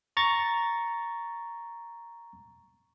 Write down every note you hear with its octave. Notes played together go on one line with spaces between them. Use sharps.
A#5 C#6 A6